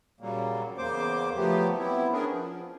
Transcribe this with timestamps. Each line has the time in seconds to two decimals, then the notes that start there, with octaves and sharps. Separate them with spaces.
0.21 A#2 C#3 F#3 G3 A#3
0.78 E2 C#3 A#3 C5 D6
1.36 F3 F#3 A3 B3 G4
1.78 B3 C4 E4
2.12 B3 C#4 D4 G#4 A#4
2.27 F3